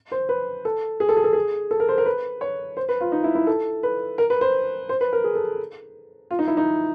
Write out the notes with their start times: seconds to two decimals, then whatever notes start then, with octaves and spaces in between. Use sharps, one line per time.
0.12 C5
0.29 B4
0.65 A4
1.00 G#4
1.09 A4
1.17 G#4
1.24 A4
1.33 G#4
1.71 A4
1.80 A#4
1.89 C5
1.98 A#4
2.06 B4
2.41 C#5
2.77 C5
2.89 B4
3.01 F4
3.12 D#4
3.24 E4
3.35 E4
3.47 A4
3.83 B4
4.18 A#4
4.30 B4
4.41 C5
4.89 C5
5.01 B4
5.13 A#4
5.24 G#4
5.35 A4
6.31 F4
6.39 D#4
6.47 E4
6.57 D#4